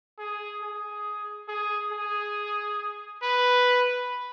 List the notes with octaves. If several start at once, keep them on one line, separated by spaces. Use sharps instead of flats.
G#4
G#4
G#4
G#4
B4